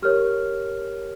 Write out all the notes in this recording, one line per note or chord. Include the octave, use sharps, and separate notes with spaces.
G4 A#4 C#5 F6